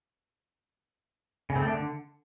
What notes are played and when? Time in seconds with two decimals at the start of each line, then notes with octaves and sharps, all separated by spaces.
1.50 C#3
1.56 C4
1.62 A3
1.68 D4
1.74 D3